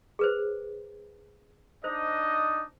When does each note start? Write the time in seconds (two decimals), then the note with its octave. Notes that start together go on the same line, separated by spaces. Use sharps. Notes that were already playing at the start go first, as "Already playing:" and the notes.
0.19 G#4 B4 C5
1.84 D4 D#4 C5 D#5